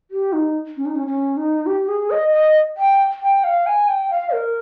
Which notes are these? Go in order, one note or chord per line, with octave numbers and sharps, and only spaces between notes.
G4
D#4
C#4
D#4
C#4
C#4
D#4
G4
G#4
D#5
D#5
G5
G5
F5
G#5
G5
F5
A#4